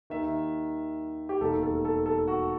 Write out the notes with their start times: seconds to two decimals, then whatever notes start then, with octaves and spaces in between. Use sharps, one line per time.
0.10 D#2 D#3 E5
1.29 G4
1.41 E1 D#2 D#3 A4
1.63 A4
1.85 A4
2.06 A4
2.28 F#4